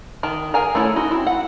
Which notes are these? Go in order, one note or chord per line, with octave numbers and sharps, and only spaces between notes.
D#3 A#4 A5
G#4 A#4 G#5 A#5
A3 C#4 E4 C#5
D#4 F#4
C4 E4
F#5